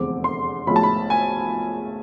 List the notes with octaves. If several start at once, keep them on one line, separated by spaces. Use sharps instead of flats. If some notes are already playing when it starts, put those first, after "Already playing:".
Already playing: F1 E2 D3 G#3 C4 D6
C6
B1 A2 F3 G#3 B5
A5
B5
G#5